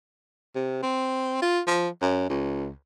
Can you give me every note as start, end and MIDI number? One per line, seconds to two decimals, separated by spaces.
0.55 0.78 48
0.83 1.39 60
1.42 1.61 65
1.67 1.89 53
2.02 2.25 42
2.29 2.72 37